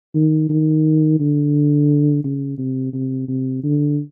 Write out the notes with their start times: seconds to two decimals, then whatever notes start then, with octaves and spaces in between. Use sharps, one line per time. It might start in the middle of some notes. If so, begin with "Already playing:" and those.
0.15 D#3
0.49 D#3
1.20 D3
2.24 C#3
2.58 C3
2.93 C3
3.28 C3
3.63 D3